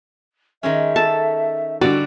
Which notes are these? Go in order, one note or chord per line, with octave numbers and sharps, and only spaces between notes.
D#3 G#3 C#4 E5
A4 A5
D3 G3 F#4 D5